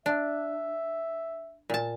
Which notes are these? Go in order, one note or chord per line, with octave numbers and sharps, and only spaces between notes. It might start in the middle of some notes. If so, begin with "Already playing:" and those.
D4 E5
A#2 A5